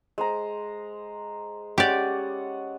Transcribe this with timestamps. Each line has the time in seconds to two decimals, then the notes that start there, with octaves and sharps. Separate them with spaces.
0.18 G#3 C5 A#5
1.78 G#3 C#4 G4 D5 F#5